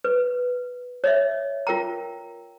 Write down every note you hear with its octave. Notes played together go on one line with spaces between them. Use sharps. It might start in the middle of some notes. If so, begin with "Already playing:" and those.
B4
C#5 D#5 E5
F4 A#4 G5 A#5